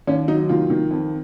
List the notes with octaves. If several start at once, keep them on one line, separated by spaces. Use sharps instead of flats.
D#2 C#4
F#3 D#4
D#3 F4
D#3
F2